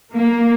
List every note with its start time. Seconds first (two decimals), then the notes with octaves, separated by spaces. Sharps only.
0.14 A#3